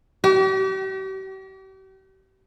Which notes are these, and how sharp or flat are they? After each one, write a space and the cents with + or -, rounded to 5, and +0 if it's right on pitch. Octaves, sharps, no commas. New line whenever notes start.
G4 -40